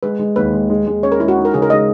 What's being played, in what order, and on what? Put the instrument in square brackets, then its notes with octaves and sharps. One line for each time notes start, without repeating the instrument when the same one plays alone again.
[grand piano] G#3 [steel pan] B4
[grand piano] G#3
[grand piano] D#2 [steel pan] B4
[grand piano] G#3
G#3
G#3
[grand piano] C#4 [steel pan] C#5
[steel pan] A#4
[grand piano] G#3 [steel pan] E4
[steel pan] F#4
[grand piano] D#4
[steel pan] A#4
[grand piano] C#3 [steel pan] G#4
[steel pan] A#4
[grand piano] G#3 [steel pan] D#5